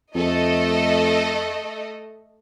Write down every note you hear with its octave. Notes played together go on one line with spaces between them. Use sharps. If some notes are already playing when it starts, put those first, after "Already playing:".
F2 A3 A4 D#5